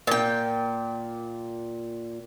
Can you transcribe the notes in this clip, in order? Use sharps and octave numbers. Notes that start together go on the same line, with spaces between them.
A#2 G5